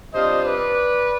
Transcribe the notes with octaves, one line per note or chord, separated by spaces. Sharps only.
C3 G3 D4 F4 C5 D#5
B4 D5